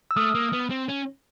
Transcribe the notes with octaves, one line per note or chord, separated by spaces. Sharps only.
E6
A3 D#6 F6
A#3
B3
C4
C#4